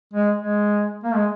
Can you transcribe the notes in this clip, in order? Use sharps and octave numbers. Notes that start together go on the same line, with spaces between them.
G#3
G#3
A#3
G#3